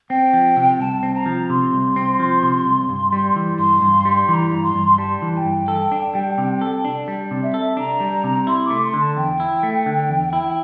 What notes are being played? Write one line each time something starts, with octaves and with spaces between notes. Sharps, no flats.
C4 G5
F3
C3
C2 A5
C4
A#5
F3
C3 C6
C2
C4
F3
C3
C2
G2
G3
E3
G2 C6
G2
G3
E3 A#5 C6
G2
C6
G2
G3 A5
E3
A5
G5
G2
A4
D4
G3
C3
A4
D4
G3
D5
C3
E5
A4
E5
D4 A#5
G3
C3
E4 C6
D6
A3
C6
D3
A5
E2 G5
E4
A3
D3
E2
E4